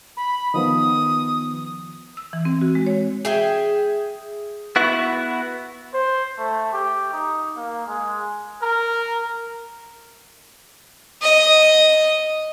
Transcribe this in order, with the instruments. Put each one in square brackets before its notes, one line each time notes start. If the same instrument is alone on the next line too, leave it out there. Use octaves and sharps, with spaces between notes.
[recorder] B5
[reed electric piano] D#3 F3 B3 [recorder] D#6
[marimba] E6
E3
C4
F#4
G#3
C#5
[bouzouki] G#4 E5 G5
[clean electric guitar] B3 E4 F#4
[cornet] C5
A3
G4
D#4
A#3
G#3
[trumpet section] A#4
[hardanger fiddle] D#5